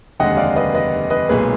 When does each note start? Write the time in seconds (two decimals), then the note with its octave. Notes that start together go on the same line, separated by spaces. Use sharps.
0.20 F1 D#2 D3 G#3 D#5 F#5
0.37 D5 F5
0.56 B4 D#5
0.74 B4 D#5
1.10 B4 D#5
1.29 B1 A#2 G#3 G#4 B4